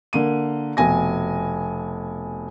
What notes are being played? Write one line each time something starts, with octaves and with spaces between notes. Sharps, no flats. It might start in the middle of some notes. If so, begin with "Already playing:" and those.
D3 A#3 D#7
F1 B2 G#5 A#6